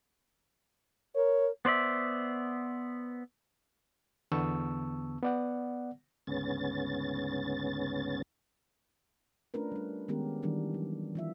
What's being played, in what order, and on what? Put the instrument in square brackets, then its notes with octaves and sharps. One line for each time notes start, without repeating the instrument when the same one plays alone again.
[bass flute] A#4 [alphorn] C#5
[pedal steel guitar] B3 C5 D5 E5
[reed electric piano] E2 D3 B3 A5 C#6 E6
B3 D5 F#5
[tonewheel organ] D2 G#2 C#3 B3 C#4 A6
[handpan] A3 C#4 D4 F4 A#4 B4
G3 D4
D#3 G#3 B3 C#4 G4 A#4
D#3 E3 G3 D4 A#4
F#3
E3 F4 E5